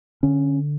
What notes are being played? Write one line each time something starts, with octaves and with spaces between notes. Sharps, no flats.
D3 C#4